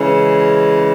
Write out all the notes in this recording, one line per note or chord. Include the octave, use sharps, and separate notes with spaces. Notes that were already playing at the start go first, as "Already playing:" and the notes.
Already playing: C#3 E3 G#3